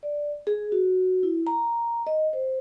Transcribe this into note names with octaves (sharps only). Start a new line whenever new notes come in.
D5
G#4
F#4
E4
A#5
D#5
C5